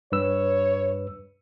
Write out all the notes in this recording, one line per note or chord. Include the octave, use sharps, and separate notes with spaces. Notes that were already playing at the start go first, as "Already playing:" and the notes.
G2 B4 C#5 E6